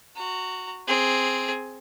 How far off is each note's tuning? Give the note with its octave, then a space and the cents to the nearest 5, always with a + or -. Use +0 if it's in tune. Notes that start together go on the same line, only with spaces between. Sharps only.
F#4 +0 A#5 -30
C4 +0 G#4 +0